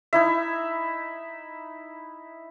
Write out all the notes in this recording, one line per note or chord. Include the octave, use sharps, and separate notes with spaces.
D#4 E4 E5